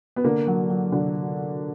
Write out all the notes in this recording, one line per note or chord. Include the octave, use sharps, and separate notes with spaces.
B3
D3 A#3
F#3
F#3
D3